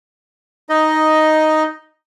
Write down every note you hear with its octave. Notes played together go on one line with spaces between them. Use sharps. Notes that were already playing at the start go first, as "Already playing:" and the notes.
D#4 D#5